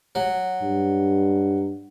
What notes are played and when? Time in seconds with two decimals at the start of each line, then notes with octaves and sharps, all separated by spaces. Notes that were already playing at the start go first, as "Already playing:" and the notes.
0.15 F#3
0.62 G2